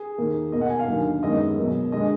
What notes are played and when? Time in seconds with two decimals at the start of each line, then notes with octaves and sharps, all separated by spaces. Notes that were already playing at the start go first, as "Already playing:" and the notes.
Already playing: G#4
0.18 D#2 D#3 A#3
0.52 B2 A#3 D#5
0.61 F#5
0.70 G#5
0.79 F5
0.87 D#2 D3 F#3 A#3
1.23 F#2 D#3 G#3 B3 D#5
1.57 B2 F#3 A#3
1.92 D3 G#3 D#5